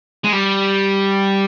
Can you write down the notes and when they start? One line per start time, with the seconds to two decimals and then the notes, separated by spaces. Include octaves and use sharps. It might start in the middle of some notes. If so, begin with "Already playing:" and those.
0.24 G#3
0.32 G3